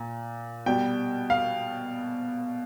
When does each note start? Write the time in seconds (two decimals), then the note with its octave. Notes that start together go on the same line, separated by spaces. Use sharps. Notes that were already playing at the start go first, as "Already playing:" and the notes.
Already playing: A#2
0.66 B2 G3 G5
1.30 F5